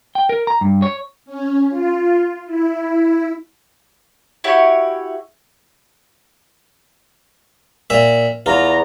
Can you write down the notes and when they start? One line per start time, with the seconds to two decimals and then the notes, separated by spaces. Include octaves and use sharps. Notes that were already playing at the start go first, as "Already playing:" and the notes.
0.15 G5
0.29 A#4
0.47 A#5
0.61 G2
0.82 C#5
1.26 C#4
1.69 F4
2.46 E4
4.44 E4 F#4 G4 C#5
7.90 A#2 E5
8.46 E2 F4 A#5